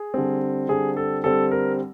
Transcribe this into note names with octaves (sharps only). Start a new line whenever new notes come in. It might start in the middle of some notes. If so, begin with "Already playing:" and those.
Already playing: G#4
D3 G3 C4
D3 G3 C4 G#4
A4
D3 G3 C4 A4
A#4